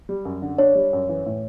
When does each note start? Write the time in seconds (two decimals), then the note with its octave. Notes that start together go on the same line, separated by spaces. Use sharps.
0.09 G3
0.25 F#2
0.42 D3
0.58 D4 C#5
0.75 G3
0.93 F#2
1.09 E3
1.26 A2